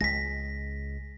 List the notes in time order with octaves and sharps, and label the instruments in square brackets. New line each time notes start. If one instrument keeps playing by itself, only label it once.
[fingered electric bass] C#2 G#3 [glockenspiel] A#6 B6